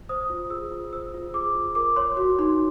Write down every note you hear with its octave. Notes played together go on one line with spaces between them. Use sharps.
C5 D#6
F4
G#4 E6
F4
C5 E6
F4
G#4 D6
F4
A#4 D6
C#5 C6
F#4 C6
D#4 C6